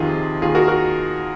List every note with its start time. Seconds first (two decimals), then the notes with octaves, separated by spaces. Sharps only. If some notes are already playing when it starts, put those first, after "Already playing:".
Already playing: F2 C3 D#3 F4 G#4
0.42 D#2 D#3 F4 G#4
0.55 F#4 A#4
0.68 F#4 A#4